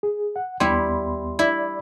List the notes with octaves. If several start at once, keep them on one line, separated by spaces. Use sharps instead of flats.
G#4
F#5
D#2 G3 B3 E4 C6
E4 D5 E5